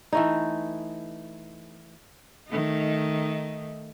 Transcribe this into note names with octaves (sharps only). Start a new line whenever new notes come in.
E3 A3 D#4
D#3 A3 D#4